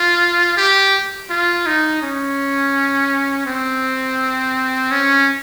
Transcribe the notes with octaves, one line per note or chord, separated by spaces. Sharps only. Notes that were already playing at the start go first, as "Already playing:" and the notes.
Already playing: F4
G4
F4
D#4
C#4
C4
C#4